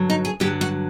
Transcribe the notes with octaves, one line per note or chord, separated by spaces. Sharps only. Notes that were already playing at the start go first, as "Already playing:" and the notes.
Already playing: G2 D3 F#3
D#4
G#4
G2 D3 F#3 G4
F#4